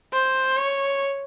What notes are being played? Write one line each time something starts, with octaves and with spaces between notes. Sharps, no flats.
C5
C#5